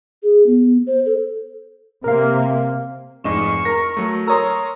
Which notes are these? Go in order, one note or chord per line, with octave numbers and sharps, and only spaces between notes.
G#4
B3
C5
A4
C3 A#3 A#4 F5
F1 G#2 D#5 C#6 E7
A#4 A#5 A#6
F#3 A3
A#4 C#5 A#5 C6 D#6 E6